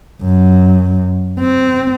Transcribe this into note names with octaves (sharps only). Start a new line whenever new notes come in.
F#2
C4